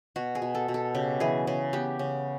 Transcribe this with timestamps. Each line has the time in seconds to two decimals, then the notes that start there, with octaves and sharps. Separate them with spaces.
0.16 B2 F#4
0.35 G#4
0.42 B2
0.55 A4
0.68 B2
0.74 A4
0.95 C#3 G4
1.20 E3 G#4
1.47 C#3 G#4
1.73 B3 G4
1.99 C#3